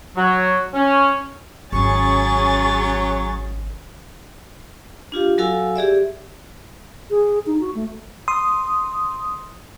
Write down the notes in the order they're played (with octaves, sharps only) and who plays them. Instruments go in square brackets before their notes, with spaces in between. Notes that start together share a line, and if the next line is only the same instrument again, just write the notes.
[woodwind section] F#3
C#4
[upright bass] G#1 [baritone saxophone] F#3 [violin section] C#4 G#4 A6 [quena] C#6
[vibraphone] D4 F4 G4 F5
F#3 F#4 A4 F5 G#5 E6
G4 G#4 D5 E5
[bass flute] G#4
D#4
F#4
A3
[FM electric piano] C6 D#6